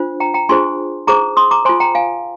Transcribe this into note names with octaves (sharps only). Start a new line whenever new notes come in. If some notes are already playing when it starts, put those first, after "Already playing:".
Already playing: D4 F4 C5
G5 A#5
G5 A#5
D4 F4 G#4 C5 G#5 C6
D#4 G#4 C5 A#5 D6
C6 D#6
A#5 D6
F4 C5 G#5 C6
G5 A#5
F5 G#5